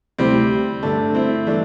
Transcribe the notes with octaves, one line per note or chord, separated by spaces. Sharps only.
D2 C3 G3 A3 C4 E4 G4
G2 D3 G3 A3 D4
C4 E4
E3 G3 A3 D4